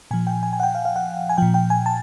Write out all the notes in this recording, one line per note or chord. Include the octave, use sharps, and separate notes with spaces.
A#2 F3 G#5
G5
G#5
G#5
F#5
G5
F5
F5
F#5
G#5
A#2 F3 G5
G5
G#5
A5